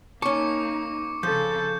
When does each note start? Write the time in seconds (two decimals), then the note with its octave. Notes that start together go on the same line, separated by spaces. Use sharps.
0.22 A#3 C#4 D#4 A5 C#6 D6 C#7
1.23 C#3 F3 A4 G6